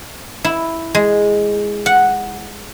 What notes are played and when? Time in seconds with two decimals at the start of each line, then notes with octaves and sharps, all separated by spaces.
0.44 E4
0.95 G#3
1.86 F#5